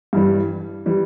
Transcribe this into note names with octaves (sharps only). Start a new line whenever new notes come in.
G2 E3 G3
E3 G3